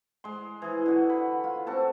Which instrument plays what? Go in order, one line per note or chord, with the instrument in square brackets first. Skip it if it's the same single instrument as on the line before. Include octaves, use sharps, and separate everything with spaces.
[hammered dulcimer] G#3 C6
E3 G#4
D3 F#4
B5
F4
C4 F#4 A4 A5